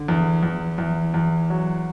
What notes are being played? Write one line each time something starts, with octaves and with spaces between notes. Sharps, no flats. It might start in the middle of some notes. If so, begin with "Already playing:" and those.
Already playing: D3
E2
E2
E2
E2
F#3